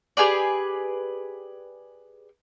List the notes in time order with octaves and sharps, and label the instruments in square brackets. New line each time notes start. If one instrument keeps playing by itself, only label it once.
[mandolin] G4 G#4 B4 D5